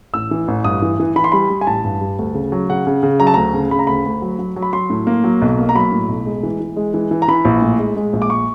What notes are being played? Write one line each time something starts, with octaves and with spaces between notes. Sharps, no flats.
A1 E6
E3
A1
G2 D#6
E3
E3
E3 B5
C6
G3 B5
G3
G#5
A1 A5
G2
G3
D2
C#3
F#3
C#3 F#5
C#3
C#3
F#3 A#5
A5
D2 A#5
C#3
C#3 B5
A#5
D2 B5
D2
F#3
F#3
F#3
B5
F#3 C6
A2
A#3
F#3
B1
A#3
A#5
F#3 B5
A2
B1
G#3
E3
E3
G#3
E3
E3
A#5
E3 B5
A#1
A2
G#3
G#3
A#1
D6
C#6